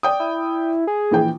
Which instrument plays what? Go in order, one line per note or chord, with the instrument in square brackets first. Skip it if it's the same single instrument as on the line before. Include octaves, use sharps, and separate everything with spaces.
[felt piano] D5 G5 D#6
[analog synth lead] E4
G#4
[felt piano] A#1 E3 G5